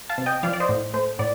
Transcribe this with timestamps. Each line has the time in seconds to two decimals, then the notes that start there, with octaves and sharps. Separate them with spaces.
0.10 F5 A5
0.18 C3
0.26 D#5 G5
0.43 F3 D5 F5
0.54 D5
0.60 C5 D#5
0.69 A2
0.94 A3 C5
1.19 A2 D5